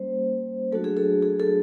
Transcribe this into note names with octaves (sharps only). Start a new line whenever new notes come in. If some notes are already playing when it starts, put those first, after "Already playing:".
Already playing: G3 A#3 C#4 C5
F#3 A3 D4 F#4 A4
G#4
A4
G#4
A4